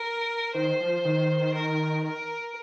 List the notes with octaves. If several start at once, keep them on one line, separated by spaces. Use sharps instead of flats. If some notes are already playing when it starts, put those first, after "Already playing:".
Already playing: A#4
D#3 C5
F3
D#3
A#4
A#4